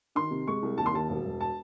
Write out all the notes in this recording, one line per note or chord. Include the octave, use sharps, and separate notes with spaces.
D#3 C6
C3
G#3 C#6
C2
D#2 A5
C6
D#2 A5
E1
E1
A5